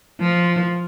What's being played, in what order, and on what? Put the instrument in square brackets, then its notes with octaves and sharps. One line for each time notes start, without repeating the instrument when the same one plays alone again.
[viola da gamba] F3